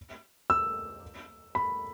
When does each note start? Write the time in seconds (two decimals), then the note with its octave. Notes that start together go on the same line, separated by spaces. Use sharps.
0.50 E6
1.55 B5